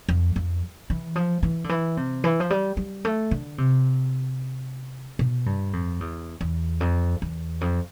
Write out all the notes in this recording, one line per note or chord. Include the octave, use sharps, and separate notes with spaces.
F2
F2
E3
F3
E3
D3
E3
C3
E3
F3
G3
G3
A3
D3
C3
B2
G2
F2
E2
E2
F2
E2
F2